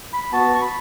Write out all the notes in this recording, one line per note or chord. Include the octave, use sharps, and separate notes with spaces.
B5
B3 F#4 A5
C#6
B5